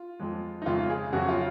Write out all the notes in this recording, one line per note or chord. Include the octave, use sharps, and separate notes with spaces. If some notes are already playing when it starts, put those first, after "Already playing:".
Already playing: F4
F2 F3 G#3
D#4
F2 C#3 G#3 C#4 F4
G#4
F2 C#3 F#3 C#4 F#4
F4